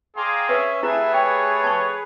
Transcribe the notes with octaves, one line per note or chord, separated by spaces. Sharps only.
G#4 D5 F5 G5 A#5 C6
C#4 B4 E5
A3 E4 G4 G#4 B4 E5 G#5
C#5 G5
A5 C#6